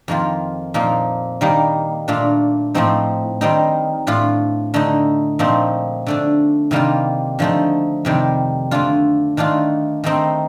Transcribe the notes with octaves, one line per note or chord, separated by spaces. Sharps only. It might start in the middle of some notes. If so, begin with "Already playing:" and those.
F2 D#3 A#3 F4
A#2 F3 A#3 D#4
D#3 G3 A#3 D#4
A#2 A3 D4 F4
A2 F3 A3 C4 D#4
D#3 G3 C4 D#4
A2 A3 D4 F4
D3 A3 D#4
A#2 F3 A3 C4 D#4
D3 A3 D4
C3 D#3 G3 A#3 F4
D3 F3 A3 D#4
F2 C3 D#3 G3
D3 A3 D4 F4
D#3 A3 D4 F4
D#3 A3 C4 D#4